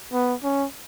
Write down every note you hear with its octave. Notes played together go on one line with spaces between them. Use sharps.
B3
C#4